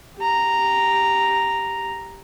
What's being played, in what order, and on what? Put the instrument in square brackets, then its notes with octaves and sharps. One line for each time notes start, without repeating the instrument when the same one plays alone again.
[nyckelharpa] G4 A#5